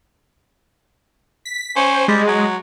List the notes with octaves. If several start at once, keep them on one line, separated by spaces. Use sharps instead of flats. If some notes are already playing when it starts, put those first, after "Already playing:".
B6
C#4 C5
G3 G#3
F#3